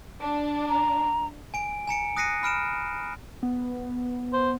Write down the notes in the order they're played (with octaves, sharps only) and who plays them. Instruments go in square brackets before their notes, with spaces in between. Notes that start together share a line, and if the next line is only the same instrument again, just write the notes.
[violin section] D4
[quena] A#5
[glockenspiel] G#5 D7
G#5 A#5 C#7 D7
D#6 F#6 A#6 C7 C#7 D#7
B5 F6 D7 E7
[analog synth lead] B3
[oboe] C5